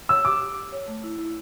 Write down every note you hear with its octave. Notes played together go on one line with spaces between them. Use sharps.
C#5 E6
G4 D6
G4
G4
C#5
A3
E4
E4